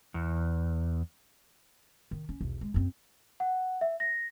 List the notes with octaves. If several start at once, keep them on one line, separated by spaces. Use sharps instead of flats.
E2
D#3
C#4
B1 E2
G#3
F#2 C4
F#5
E5
A#6